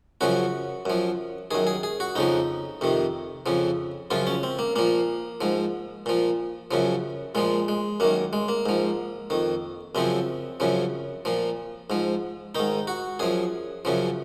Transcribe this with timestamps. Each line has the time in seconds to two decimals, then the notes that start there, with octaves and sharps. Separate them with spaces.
0.21 F#2 C#3 F3 F#4
0.86 F#2 F3
1.51 F#2 D#3 G#4
1.67 G#4
1.83 G#4
2.00 F#4
2.16 F2 C#3 F3 D#4
2.81 F2 C3 D#3
3.46 F2 C#3 F3
4.10 F#2 C#3 F3 F4
4.27 C#4
4.43 C4
4.59 A#3
4.76 A#2 F3 A#3
5.41 G#2 F3
6.06 A#2 F3
6.71 F#2 C#3 F3
7.35 A#2 F3 G#3
7.68 G#3
8.00 F#2 D#3 A#3
8.33 G#3
8.48 A#3
8.66 G#2 F3
9.30 F2 D#3
9.95 F#2 C#3 F3 C4
10.60 F#2 C#3 F3
11.25 A#2 F3
11.90 G#2 F3
12.55 G#2 D#3 D#4
12.87 F#4
13.19 F#2 F3 G#4
13.85 F#2 C#3 F3